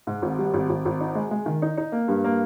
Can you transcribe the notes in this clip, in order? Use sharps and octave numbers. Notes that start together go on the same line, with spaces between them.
G#2
G#1
G3
G#1
G#1
G#1
D#4
G#3
G#3
D#3
D#4
D#4
A#3
G2
A#3